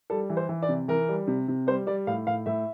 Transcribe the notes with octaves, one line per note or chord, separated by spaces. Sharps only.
G3 A4
E3
C5
E3
D5
C3
E3 A#4
G3
C3
C3
G3 C5
G3 D5
A2 F5
A2 F5
A2 E5